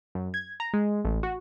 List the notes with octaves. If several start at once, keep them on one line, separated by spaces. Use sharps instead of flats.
F#2
G#6
A#5
G#3
A1
F#4